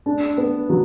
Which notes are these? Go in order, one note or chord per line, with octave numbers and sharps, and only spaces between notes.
D4
B3
F#3